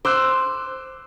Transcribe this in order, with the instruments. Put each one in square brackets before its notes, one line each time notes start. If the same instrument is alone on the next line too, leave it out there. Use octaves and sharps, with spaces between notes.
[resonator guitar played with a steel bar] C5 [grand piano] D6 E6 F#6